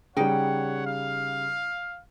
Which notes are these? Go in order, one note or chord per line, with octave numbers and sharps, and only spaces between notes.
C#3 G3 D#4 C#5 F#5 G5
F5